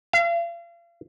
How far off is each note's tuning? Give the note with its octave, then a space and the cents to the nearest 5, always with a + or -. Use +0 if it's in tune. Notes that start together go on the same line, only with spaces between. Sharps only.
F5 -40